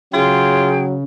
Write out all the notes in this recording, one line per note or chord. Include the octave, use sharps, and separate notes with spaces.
C#3 F#3 F4 G#4 G5